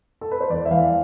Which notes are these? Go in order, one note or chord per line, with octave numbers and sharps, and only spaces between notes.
A4
B4
C5
E2 D5
E5
E3 F5